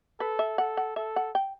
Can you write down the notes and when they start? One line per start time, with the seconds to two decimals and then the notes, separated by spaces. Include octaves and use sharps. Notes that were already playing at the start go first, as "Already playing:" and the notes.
0.20 A4 B4
0.39 E5
0.58 A4 F#5
0.77 F#5
0.96 A4 E5
1.16 F#5
1.35 G5